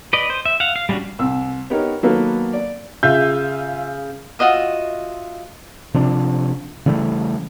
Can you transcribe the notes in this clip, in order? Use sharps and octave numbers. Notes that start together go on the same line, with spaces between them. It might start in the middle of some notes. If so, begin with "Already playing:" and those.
B4 D5 D#5
C5
E5
F5 F#5
F5
G3 G#3 C#4 D4 F#4
C2 E6
B3 D#4 G4 A#4 C#5
D#3 F#3 A#3 B3 A4 B4
D5
C#3 F4 E5 G6
F4 F#4 D#5 E5
C3 F3 D4
C#3 E3 G3 A3